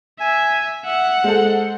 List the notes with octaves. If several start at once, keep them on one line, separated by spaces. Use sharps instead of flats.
E5 G#5
E5 F#5
G#3 A4 C5